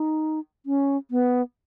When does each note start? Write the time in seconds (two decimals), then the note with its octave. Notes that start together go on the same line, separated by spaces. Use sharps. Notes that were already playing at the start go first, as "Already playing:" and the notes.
Already playing: D#4
0.66 C#4
1.11 B3